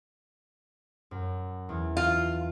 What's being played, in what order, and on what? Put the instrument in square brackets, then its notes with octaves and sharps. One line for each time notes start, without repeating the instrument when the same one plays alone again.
[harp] F#2
E2
[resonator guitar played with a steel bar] F4